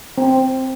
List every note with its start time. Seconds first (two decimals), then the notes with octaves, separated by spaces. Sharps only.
0.18 C4